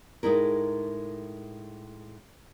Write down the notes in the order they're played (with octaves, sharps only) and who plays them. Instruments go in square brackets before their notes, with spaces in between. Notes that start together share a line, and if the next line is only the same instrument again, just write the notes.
[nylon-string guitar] A2 G#3 D#4 E4 A#4